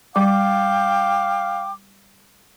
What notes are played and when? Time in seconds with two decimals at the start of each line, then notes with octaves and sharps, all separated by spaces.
0.16 G3 F5 G5 D6